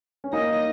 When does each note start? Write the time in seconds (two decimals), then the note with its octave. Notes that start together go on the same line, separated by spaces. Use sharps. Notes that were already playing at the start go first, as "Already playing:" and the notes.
0.24 C#4
0.33 A#3 D#4 D#5